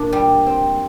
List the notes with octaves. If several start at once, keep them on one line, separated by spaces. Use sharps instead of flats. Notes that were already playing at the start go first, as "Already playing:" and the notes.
Already playing: A#2 D4
G3
C4